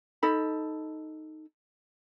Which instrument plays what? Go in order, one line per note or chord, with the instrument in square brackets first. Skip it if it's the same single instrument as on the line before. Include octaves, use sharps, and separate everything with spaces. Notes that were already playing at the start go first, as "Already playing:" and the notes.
[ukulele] D#4 A4 B5